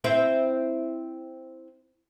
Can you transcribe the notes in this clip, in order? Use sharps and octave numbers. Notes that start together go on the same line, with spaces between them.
C4 E4 C5